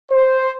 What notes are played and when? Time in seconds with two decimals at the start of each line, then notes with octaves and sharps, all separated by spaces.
0.12 C5